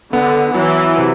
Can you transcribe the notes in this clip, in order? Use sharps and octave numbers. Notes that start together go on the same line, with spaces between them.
D3 B3
E3 F#3
C3